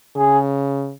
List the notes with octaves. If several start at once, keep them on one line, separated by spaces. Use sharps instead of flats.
C#3 G#4